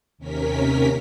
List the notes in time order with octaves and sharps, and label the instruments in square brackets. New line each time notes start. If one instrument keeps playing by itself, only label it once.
[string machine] D#2 C3 C#4 A#4 B6